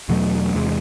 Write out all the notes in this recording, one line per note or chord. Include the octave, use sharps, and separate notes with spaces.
E2 B2 F#3 A3
E2 C3 E3 G#3